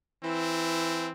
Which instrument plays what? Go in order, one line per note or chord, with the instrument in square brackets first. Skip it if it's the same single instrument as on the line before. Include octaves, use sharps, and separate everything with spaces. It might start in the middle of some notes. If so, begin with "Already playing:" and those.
[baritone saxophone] E3 [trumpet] C4